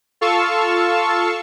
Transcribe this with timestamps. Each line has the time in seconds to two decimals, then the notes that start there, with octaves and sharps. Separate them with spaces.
0.21 F4 A4 F5 A5 C#6 E6